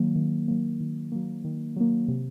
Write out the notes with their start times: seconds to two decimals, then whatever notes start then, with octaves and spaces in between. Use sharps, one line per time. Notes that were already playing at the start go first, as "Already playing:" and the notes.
Already playing: D#3 F#3 A#3
0.16 D#3
0.48 F#3 A#3
0.80 D#3
1.12 F#3 A#3
1.45 D#3
1.76 F#3 A#3
2.08 C3